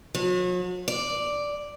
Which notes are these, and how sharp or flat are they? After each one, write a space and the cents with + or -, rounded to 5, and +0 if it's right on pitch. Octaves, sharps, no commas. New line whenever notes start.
F#3 -40
D5 +0